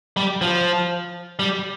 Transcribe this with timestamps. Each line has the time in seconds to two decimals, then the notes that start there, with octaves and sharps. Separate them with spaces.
0.17 G3
0.41 F3
1.39 G3